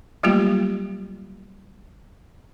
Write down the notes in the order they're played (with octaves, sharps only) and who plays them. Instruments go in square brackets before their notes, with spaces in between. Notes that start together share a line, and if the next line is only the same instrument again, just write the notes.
[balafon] F#3 G3 A3 A#3 F4 G4